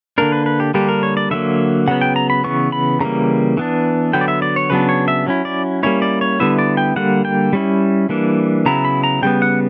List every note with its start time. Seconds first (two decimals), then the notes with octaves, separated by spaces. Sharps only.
0.18 D3 A#3 D4 A#4
0.32 B4
0.46 B4
0.60 G4
0.74 D3 G3 A#3 D4 G4
0.89 A#4
1.03 C#5
1.17 D5
1.31 D3 F#3 A#3 E5
1.88 C#3 F#3 B3 F#5
2.01 G5
2.16 A#5
2.30 B5
2.44 C#3 E3 B3 C#6
2.72 B5
3.00 C#3 E3 G3 A#3 A#5
3.57 E3 B3 D4
4.13 D3 F#3 B3 G5
4.21 D5
4.28 E5
4.42 D5
4.56 C#5
4.70 C#3 F#3 B3 D4 B4
4.89 C#5
5.08 E5
5.27 F#3 C#4 E4
5.45 D5
5.83 G3 A#3 C#4 E4 C#5
6.02 D5
6.21 C#5
6.40 D3 G3 B3 E4 E5
6.59 D5
6.77 G5
6.96 D3 G3 A#3 F#5
7.25 G5
7.53 G3 C#4 E4
8.09 E3 G3 A#3 D4
8.66 C#3 F#3 B3 E4 A#5
8.85 B5
9.04 A#5
9.22 C#3 G3 B3 G5
9.42 F#5